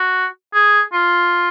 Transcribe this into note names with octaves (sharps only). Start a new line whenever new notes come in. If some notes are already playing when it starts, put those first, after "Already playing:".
Already playing: F#4
G#4
F4